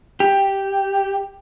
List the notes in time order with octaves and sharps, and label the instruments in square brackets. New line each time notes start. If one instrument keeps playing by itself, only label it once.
[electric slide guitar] G4